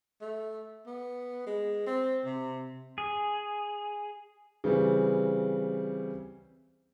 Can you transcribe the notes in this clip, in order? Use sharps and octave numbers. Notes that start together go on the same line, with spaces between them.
A3
B3
G#3
C4
C3
G#4
C#3 E3 G3 C4